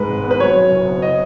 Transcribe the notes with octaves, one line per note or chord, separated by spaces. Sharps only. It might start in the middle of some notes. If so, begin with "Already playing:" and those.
Already playing: G#2 G#3 B4
G#1
B3
B4
F#3 C#5
F#2
F#1
B3
B3 D#5